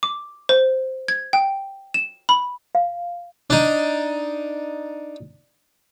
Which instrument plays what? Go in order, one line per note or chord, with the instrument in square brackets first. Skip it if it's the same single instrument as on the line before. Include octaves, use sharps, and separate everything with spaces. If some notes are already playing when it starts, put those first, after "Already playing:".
[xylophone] D6
C5
G#6
G5
E7
B5
[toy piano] F5
[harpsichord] D4 D#4